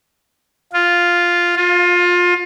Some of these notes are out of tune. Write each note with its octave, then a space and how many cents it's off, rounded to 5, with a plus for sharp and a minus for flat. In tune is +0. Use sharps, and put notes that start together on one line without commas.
F4 +0
F4 +25